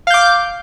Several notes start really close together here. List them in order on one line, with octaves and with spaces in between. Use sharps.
F5 G6 D6